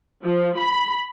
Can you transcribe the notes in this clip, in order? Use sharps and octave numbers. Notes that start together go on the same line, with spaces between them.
F3
B5